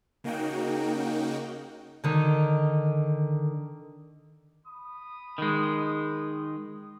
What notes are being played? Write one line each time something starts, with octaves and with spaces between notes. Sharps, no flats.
C#3 A#3 D#4 F#4 G5
D3 D#3
B5 D#6
D#3 G#3